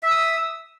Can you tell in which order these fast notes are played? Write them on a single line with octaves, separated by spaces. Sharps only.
E5 E6 D#6